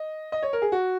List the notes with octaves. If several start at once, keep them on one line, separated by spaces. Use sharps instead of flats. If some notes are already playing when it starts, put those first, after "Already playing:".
Already playing: D#5
D#5
C#5
A#4
G#4
F#4